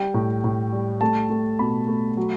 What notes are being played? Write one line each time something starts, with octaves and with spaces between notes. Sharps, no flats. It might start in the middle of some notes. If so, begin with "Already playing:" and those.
Already playing: G3 G5
A2
A2
G3
A3 A5
A3
B2 B5
A3
F#3